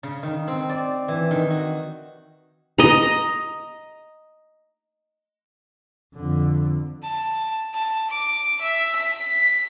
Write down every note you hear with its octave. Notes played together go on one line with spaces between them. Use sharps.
C#3
D#3
C4
D5
E3
D#3
F#4
D#5 A#5
F2 D3
A5
A5
D6
E5
B6